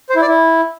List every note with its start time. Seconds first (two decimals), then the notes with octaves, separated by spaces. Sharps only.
0.10 C5
0.16 E4
0.22 D5
0.28 E4